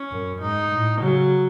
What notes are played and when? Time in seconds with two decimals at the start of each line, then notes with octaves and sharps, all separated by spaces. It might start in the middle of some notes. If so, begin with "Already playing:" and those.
Already playing: C#4
0.12 F#2
0.41 G#2 D#4
0.72 A2
1.01 C#3 F#3